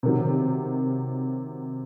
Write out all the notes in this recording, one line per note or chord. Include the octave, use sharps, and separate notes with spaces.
C3 D#3 F#3